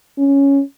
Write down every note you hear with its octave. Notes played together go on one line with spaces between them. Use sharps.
C#4